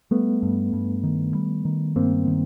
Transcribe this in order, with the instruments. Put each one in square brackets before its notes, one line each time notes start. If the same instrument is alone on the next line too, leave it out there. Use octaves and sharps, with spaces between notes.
[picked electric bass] G3 [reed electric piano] A3 B3
[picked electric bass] G2
G2
D#3
G3
D#3
[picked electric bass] G2 [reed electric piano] A#3 C4
[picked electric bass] D#3